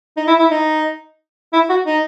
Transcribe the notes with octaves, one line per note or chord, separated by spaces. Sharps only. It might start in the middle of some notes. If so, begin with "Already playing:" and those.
D#4
E4
E4
D#4
E4
F#4
D#4